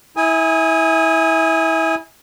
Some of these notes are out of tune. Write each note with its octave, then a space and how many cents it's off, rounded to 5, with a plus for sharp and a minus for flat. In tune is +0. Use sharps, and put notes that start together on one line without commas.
E4 -25 G#5 -10 D#6 +25